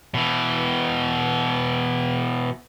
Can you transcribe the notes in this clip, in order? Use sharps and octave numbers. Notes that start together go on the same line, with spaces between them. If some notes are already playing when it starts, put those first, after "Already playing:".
B2 E3